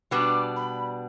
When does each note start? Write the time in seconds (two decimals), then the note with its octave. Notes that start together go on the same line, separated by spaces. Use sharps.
0.11 B2 G3 B3 D4 D6
0.56 B5